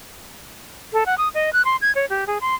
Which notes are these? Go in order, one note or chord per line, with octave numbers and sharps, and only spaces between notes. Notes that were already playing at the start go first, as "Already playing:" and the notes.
A4
F#5
D#6
D#5
F#6
C6
G#6
C#5
G4
G#4
C6